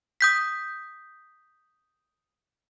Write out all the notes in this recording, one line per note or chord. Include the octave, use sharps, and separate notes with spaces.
D#6 G6 B6